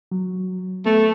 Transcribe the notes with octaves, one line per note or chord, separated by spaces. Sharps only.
F#3
A3 B3